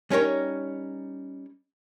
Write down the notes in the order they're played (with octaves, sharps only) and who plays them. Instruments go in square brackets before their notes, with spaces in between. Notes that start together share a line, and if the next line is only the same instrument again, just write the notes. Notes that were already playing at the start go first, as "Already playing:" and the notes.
[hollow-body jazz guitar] G3 C#4 D#4 A#4 C#5